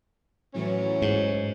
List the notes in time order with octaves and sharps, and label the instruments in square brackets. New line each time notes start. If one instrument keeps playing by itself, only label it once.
[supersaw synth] A2 E3 F#3 [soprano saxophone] C#4
[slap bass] G#2